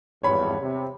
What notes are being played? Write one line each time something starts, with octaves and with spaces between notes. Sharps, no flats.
G#1 E2 G2 C#5 B5
C3